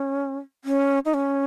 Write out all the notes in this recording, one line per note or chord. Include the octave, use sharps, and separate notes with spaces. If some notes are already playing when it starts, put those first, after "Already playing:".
Already playing: C#4
C#4
D#4
C#4